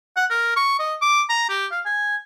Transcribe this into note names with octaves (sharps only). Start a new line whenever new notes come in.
F#5
A#4
C#6
D#5
D6
A#5
G4
F5
G#5